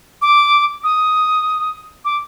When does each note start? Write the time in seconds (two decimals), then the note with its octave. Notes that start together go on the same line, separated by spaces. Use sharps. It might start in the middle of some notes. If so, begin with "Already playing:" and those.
0.22 D6
0.84 D#6
2.05 D6